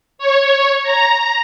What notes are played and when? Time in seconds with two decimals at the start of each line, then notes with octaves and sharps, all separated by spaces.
0.18 C#5
0.83 A#5